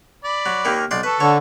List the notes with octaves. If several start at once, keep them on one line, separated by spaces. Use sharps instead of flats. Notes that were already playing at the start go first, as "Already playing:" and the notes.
D5 B5
F#3
D#2 D#3 A#3
B1 D5 C6
A4 B4 A5 C#6
D3 C#5